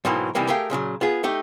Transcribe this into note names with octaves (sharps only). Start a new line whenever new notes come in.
G#2 B2 D#3 E3 F#3 A#3
C3 D#3 E3 G3 A#3
A3 G4 G#4 A#4 F5 G5
A#2 C#3 F3 F#3
B3 F4 G#4
A3 D#4 G4